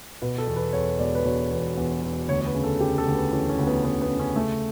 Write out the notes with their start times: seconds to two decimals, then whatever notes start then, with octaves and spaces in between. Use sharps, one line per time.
0.22 B2 B4
0.38 A4
0.47 E2
0.56 B4
0.73 E2 C#5
0.99 E1 D5
1.15 B4
1.25 E1 C#5
1.51 E2
1.77 E2
2.03 E2
2.29 D2 C#5
2.41 C#5
2.46 B4
2.54 C#3
2.64 A4
2.80 C#3 G4
2.98 A4
3.07 D2
3.15 B4
3.32 E3 C#4
3.49 C#4
3.59 D2
3.67 B3
3.85 D2 B3
4.02 B3
4.10 C#3
4.19 C#4
4.36 C#3 A3